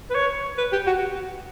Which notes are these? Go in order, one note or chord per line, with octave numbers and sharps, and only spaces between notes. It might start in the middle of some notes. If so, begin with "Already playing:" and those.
B4
C#5
B4
G4
F#4